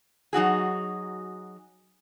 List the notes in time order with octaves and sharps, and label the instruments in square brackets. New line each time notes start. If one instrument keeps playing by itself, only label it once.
[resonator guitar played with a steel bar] F#3 D#4 F#4 G#4